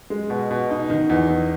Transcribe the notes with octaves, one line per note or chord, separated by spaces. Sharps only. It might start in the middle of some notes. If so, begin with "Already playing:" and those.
G#3
B2
B2
D#4
D#3
E2
E2